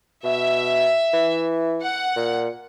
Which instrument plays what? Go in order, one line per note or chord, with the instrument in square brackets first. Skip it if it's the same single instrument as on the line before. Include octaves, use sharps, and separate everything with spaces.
[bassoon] B2 [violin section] E5
[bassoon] E3
[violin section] F#5
[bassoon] A#2